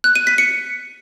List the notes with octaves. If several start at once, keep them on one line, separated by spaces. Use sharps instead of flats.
F#6
D#7
B6
C#7